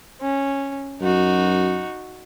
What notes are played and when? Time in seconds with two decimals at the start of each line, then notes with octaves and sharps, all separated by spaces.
0.21 C#4
1.02 F#2 D#4 F#4